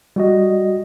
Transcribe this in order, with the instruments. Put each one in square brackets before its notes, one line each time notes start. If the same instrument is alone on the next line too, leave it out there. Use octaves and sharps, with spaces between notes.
[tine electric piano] G3 F#4 D#5